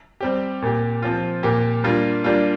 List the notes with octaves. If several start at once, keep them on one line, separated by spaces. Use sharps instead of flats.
G3 C4 G4
A#2 A#3 G4
F3 C4 F4
A#2 A#3 G4
G3 A#3 D4 F4
G3 A#3 D4 F4